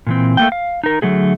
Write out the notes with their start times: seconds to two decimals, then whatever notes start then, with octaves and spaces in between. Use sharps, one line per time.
0.07 A#2 E3 C4
0.37 A3 A#3 G5
0.52 F5
0.84 D#4 A#4
1.02 D3 F#3 A3 G#4